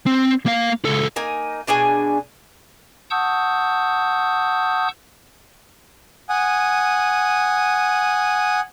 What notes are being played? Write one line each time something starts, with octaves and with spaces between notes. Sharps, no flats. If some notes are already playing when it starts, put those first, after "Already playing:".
C4
A#3 F5
C#2 A4
A#3 D#4 G#5
B2 D4 G#4 G#5
F#5 A5 C#6 D#6 E6 G6
F#5 G#5 D#6